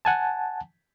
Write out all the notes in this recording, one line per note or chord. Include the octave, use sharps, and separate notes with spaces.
F#5 G#5 A5